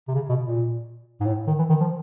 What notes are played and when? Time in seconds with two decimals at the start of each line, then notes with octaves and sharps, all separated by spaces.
0.08 C3
0.15 C#3
0.29 B2
0.44 A#2
1.20 G#2
1.25 A2
1.47 D#3
1.59 E3
1.70 D#3
1.81 F3